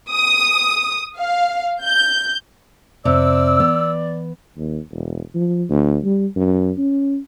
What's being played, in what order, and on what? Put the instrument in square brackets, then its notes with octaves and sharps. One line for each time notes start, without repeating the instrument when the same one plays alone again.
[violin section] D#6
F5
G6
[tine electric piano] F2 [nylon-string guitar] C3 [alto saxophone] D5 [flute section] E6
[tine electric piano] E3 [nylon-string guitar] B3
[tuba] D#2
E1
F3
D2
G3
F#2
C#4